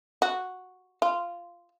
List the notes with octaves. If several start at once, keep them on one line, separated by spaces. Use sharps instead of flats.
F#4
F4